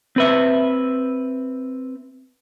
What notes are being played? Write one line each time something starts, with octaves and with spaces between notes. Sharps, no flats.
C4 B4 E5